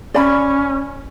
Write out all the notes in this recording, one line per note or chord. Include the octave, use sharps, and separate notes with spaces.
C#4 D5 B5